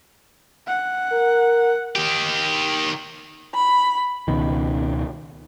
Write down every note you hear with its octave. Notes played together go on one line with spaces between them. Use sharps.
F#5
A#4
D#3 G4
B5
C#2 B2 D#3